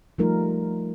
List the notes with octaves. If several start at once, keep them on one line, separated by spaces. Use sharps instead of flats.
F3 G3 A3 D#4 F4 A#4